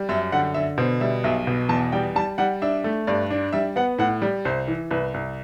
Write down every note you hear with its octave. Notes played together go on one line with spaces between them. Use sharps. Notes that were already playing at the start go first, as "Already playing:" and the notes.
Already playing: G3
F#2 E5
D3 F#5
D3 E5
B2 C5
G3 E5
B1 E5
B2
E2 A5
G3 G5
G3 A5
G3 F#5
D4 E5
A3
G2 D5
D4
G3 E5
B3 F#5
A2 F#5
G3
C2 C5
E3
C2 B4
C2